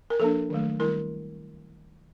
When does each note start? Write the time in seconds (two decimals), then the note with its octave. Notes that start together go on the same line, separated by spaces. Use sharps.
0.10 A#4
0.20 F3 A#3 D4 A4
0.50 D#3 F#3 A3
0.80 D#3 G3 C4 E4 A#4